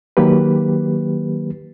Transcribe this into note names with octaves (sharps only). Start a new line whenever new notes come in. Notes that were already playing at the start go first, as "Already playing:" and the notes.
D#3 F#3 A#3 G4 B4